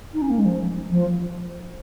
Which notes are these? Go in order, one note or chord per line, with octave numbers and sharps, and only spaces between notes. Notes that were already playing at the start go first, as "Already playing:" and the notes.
D#4
C#4
A#3
G#3
F3
F3